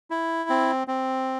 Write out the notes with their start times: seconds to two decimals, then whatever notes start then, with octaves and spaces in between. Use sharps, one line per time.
0.10 E4
0.50 C4
0.87 C4